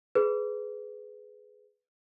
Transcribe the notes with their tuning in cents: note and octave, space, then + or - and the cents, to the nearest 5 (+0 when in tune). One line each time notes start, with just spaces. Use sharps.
G#4 +20 B4 +20